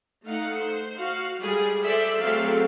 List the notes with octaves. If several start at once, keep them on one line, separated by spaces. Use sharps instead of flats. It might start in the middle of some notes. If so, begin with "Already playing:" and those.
A3 D#4 F5 F#5
C5
F#4 F5
G3 G#3 G#4
A4 C5 D5 E5
F#3 A3 C4 G#4 A4 F5